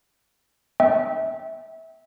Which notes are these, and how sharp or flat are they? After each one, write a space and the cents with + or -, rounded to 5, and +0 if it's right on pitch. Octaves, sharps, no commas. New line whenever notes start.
E5 -25 G5 +0